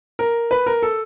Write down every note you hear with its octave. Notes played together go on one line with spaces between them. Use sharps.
A#4
B4
A#4
A4